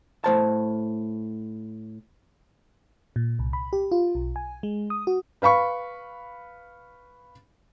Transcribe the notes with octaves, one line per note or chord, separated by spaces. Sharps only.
A2 C5 A5
A#2
C2
B5
G4
F4
B1
G#5
G#3
D#6
F#4
B4 F5 B5 C#6